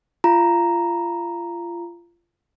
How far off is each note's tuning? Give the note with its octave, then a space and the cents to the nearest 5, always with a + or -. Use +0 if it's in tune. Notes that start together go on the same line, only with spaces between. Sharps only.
F4 -25 A#5 +0